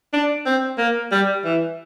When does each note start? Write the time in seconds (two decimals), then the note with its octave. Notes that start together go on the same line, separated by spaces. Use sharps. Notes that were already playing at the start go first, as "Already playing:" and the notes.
0.13 D4
0.46 C4
0.78 A#3
1.12 G3
1.45 E3